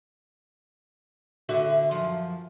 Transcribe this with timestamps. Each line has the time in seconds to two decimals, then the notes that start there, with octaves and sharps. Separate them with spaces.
1.49 D3 F#4 E5
1.91 F#2 F3